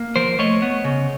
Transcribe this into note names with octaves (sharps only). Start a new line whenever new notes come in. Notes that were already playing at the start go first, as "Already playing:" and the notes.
Already playing: A#3
F3 A#4 C5
A3 C#5 D#5
B3
C#3